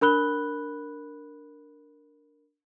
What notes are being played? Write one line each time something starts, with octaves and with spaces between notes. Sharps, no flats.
D4 A#4 B5 F#6 G7